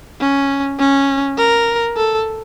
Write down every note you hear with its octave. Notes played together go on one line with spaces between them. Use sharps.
C#4
C#4
A#4
A4